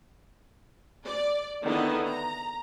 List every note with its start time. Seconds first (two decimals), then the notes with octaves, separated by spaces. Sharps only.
1.05 D5
1.63 D3 D#3 B3 E4 D#5
2.06 A#5